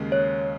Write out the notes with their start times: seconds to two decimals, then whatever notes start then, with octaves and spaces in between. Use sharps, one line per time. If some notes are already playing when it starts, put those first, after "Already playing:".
Already playing: D#2 C#3 G#3
0.12 C#5